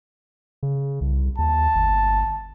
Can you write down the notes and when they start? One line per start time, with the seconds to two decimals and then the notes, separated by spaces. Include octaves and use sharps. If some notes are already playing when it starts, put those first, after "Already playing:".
0.63 C#3
1.01 C2
1.38 D#2 A5
1.75 G1